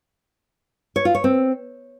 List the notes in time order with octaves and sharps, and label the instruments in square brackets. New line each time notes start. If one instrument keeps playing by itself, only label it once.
[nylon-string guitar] C#5
F4
C#5
C4